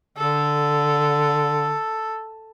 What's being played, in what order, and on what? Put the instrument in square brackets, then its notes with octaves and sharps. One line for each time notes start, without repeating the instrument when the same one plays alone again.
[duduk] D3 [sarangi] A4